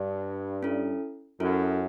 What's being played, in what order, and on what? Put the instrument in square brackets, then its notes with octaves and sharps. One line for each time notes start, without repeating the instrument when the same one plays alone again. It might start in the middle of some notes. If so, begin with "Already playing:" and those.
Already playing: [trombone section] G2
[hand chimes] C#4 E4 A4
[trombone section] F#2 [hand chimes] C#4 E4 A4